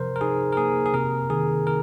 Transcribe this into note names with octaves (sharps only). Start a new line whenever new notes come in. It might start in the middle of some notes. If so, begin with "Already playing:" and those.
Already playing: C3 F3 A#4 C5
A#4
D#4 G#4
A#4
A#3 G#4
G#4
C3 A#4
D#3 G#4
D#3 A#4